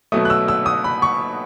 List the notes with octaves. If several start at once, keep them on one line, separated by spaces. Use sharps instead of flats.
B2 F#3 A3 D#6
F#6
E6
E6
D#6
B5
C#6